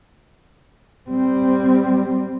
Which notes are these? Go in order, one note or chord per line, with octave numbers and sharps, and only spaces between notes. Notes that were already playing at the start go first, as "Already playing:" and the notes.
G3 C4